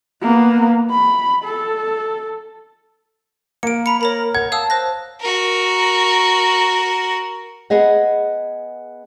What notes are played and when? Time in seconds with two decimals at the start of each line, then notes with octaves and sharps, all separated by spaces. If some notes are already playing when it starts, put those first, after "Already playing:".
0.22 A#3 B3
0.90 B5
1.44 A4
3.63 A#3 C#7 D7
3.86 A#5 B5 C#7
4.01 A#4 C#5 A#5 B5
4.35 A#4 F#5 G#6
4.52 F5 A5 D#6 E6
4.70 C5 F#6 A#6
5.20 F#4 A#4
7.70 B3 G#4 D#5 F#5